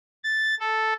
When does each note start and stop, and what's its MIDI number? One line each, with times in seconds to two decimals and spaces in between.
0.24 0.55 93
0.60 0.93 69